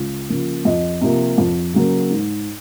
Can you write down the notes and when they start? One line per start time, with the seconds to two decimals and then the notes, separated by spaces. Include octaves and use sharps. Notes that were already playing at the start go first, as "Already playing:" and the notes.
Already playing: C#2
0.29 C#3 F3 A#3
0.65 F2 D#5
1.01 C3 F3 A#3
1.38 F2
1.73 C#3 F#3 A#3
2.10 G#2